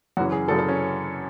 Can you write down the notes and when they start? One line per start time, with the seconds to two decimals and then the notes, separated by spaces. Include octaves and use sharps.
0.17 F#2 C#3 E3 F#4
0.32 G#4
0.48 F#2 C#3 E3 A4
0.59 A4
0.69 C#4